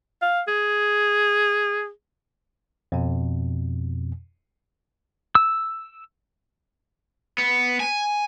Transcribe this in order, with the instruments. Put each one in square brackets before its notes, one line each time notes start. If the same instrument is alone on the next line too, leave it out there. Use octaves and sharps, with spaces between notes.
[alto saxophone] F5
G#4
[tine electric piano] F2 B2
[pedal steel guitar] E6
[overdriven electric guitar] B3
G#5